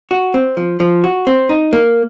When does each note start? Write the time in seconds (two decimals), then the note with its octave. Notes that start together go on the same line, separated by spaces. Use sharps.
0.11 F#4
0.34 C4
0.57 F3
0.80 F3
1.04 F#4
1.27 C4
1.49 D#4
1.73 A#3